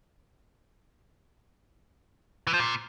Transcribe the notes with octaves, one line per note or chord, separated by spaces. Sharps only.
E3
F3
A#2